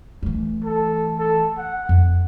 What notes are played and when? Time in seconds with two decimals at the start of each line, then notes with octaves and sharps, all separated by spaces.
0.23 E3 A3
0.64 A4
1.19 A4
1.58 F#5
1.89 F2